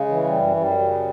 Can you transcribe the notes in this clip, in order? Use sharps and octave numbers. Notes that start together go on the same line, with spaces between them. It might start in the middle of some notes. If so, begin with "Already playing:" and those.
Already playing: C#3 G#3
E3
G3
F#2
F#2 G3
C#3